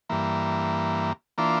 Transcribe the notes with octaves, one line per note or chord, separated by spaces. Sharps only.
G2 E3 A#3
E3 A#3 D4 F4